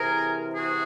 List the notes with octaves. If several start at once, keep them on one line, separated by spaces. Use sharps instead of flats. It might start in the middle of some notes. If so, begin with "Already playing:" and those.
Already playing: C3 E3 G#4 A#4
F#4 G#4